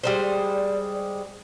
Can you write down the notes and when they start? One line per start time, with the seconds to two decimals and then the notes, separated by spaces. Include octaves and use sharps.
0.04 G3 G#3 C5 D5